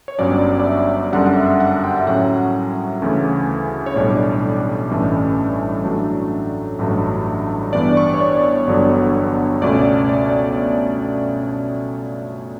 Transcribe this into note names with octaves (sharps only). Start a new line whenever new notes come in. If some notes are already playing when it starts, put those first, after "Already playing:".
C#5
G1 G2 F#3 C#4 D5
D5
E5
F#2 D3 G3 F#5
F#5
E5
F#5
G5
E5
A2 F#3 C#4 F#5
D2 C#3 E3 A3 C#4
C#5
B1 A2 G3 D4 D5
A1 G2 E3 A3 C#4
A2 F#3 A3 D4
A1 G2 F#3 A3
G2 E3 B3 D4 D5
C#6
C#5
D5
C#5
G1 G2 D3 F#3 B3
C#2 B2 A3 C#4 D5
D5